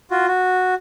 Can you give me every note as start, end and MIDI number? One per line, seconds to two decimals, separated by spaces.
0.11 0.27 65
0.11 0.27 66
0.27 0.74 66